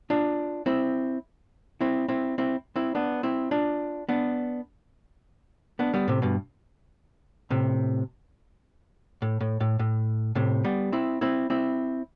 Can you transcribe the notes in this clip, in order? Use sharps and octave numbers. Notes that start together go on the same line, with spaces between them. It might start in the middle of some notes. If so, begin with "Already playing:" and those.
D4 F4
C4 E4
C4 E4
C4 E4
C4 E4
C4 E4
B3 D4
C4 E4
D4 F4
B3 D4
B3 D4
G3 B3
A2 C3
G2 B2
A2 C3
A2
A2
A2
A2
A2 C3
G3 B3
C4 E4
C4 E4
C4 E4